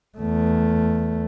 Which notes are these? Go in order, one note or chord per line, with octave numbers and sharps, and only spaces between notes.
E2 A3